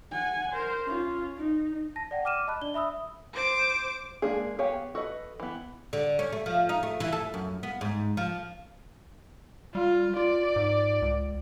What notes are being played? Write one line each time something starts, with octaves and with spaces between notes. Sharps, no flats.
F#5 G#5
A#4 C5
C#4 F4
D#4
A5 A#6
D5 F#5 G5
D6 F6 D#7 E7
D#5 A5 B5 F#6
D4 D5 G7
E5 B5 D#6 E6
C5 D6
G#3 A#3 D4 G#4
B3 G4 C#5 F5 G#5
F#4 A4 B4 D#5
E3 B3
D3
C#4
A3
F3
D#4
A3
E3
A4
F#2
B3
G#2
F3
G3 F4
F4 D5
G#2
C#2